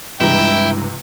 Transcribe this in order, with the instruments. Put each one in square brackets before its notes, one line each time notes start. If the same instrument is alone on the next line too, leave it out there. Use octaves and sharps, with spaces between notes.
[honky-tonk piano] C#2 C3 E3 [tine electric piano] G2 G#3 A#5 [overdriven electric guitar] E4 [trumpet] G5